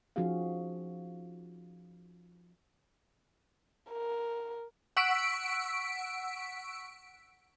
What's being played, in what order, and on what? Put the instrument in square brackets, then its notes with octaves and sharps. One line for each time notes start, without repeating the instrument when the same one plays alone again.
[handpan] F3 C#4 D#4 F#4 G#4 F5
[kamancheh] A#4
[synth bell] F#5 C#6 E6 B6 D7